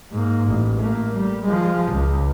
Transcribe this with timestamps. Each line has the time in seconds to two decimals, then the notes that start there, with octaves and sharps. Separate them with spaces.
0.12 G#2 A#3
0.48 A1
0.80 A3 A#3
1.13 G3
1.45 F3 G#3
1.91 C#2